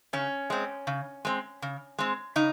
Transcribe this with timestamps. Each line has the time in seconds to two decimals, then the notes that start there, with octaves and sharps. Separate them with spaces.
0.13 C#3 C#4
0.50 G#3 C4
0.87 C#3
1.25 G#3 C4
1.62 C#3
1.98 G#3 C4
2.36 C#3 D#4